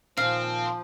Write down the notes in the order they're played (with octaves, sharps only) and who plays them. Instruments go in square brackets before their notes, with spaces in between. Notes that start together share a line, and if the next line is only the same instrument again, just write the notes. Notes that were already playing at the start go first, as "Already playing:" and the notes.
[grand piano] A#2 D#3 A#3 [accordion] F3 [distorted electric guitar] C4 [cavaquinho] F5